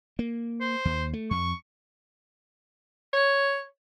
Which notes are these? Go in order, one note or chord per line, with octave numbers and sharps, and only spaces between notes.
A#3
C5
D#2
A3
F2 C#6
C#5